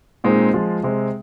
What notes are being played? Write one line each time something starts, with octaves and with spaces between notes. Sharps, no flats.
A#2 G#3 C4 D#4
F3 G#3 F4
C3 G#3 C4